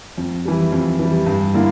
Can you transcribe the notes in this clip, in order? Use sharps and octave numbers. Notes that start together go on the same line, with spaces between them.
F2
E3 G3
F2
E3
G3
G2
D3 A#3 E4